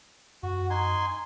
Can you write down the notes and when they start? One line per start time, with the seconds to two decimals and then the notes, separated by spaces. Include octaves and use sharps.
0.43 F#2 F#4
0.70 D#4 G#5 C6